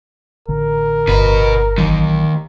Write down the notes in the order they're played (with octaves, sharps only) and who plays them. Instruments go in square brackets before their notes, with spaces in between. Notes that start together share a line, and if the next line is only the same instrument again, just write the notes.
[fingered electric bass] A1 D3 [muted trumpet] A#4
[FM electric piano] G1 [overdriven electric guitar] B2 B4
[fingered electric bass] A#1 E3 F#3 [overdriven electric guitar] D#2 D#3